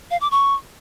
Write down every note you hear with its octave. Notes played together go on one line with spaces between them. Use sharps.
F5
D6
C#6